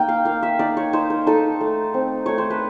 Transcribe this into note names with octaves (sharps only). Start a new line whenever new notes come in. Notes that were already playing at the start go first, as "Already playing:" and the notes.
Already playing: A#3 D#4 G5
F5
A#3 F5
E5
D#4 D5
C#5
D#4 C5
A#4
D#4 A4
A3
C4
A3 C#5
C5
B4